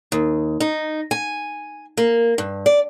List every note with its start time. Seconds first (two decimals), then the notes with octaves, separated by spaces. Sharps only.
0.12 D#2
0.60 D#4
1.11 G#5
1.97 A#3
2.38 G2
2.66 D5